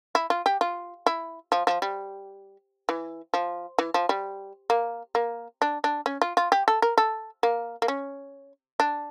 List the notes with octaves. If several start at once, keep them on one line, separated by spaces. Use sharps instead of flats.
E4
F4
G4
F4
E4
F3
F3
G3
E3
F3
E3
F3
G3
A#3
A#3
D4
D4
C#4
F4
F4
G4
A4
A#4
A4
A#3
A#3
C#4
D4